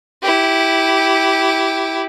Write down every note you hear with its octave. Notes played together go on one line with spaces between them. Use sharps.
E4 G4